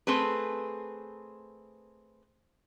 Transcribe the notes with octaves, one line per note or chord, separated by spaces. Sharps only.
A3 C4 G#4 B4